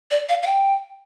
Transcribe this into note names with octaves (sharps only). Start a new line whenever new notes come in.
D5
F5
F5
G5